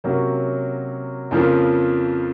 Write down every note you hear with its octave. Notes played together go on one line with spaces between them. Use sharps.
C3 F#3 A#3 C#4
F2 C#3 F3 A#3